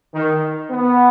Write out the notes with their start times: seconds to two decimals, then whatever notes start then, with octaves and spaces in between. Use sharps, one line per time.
0.14 D#3
0.70 B3